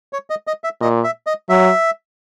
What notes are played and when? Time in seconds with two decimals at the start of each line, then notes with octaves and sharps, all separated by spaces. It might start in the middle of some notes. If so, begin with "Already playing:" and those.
0.13 C#5
0.30 D#5
0.47 D#5
0.64 E5
0.81 A#2 D#5
1.04 E5
1.27 D#5
1.49 F#3 E5